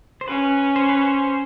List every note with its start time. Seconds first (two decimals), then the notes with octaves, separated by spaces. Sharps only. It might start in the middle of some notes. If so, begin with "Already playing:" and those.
0.21 C5
0.28 C#4 B4
0.76 C5
0.89 B4
1.01 C5